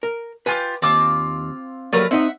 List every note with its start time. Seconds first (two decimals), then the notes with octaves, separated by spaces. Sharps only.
0.03 A#4
0.46 D4 F4 G4 B4 G#5
0.82 D#2 C4 F4 D6
1.93 F#3 G3 A3 A#3 A#4 B4
2.11 C4 D#4 D#5 E5 F#5